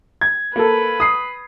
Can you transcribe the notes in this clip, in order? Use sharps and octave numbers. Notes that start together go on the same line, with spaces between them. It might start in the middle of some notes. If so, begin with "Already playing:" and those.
G#6
A#3 A4 B4
D#6 C7